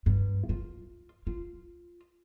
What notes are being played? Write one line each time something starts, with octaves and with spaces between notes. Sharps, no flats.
G2
F4
F4